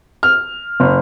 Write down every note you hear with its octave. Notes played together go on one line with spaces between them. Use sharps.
F6
F#1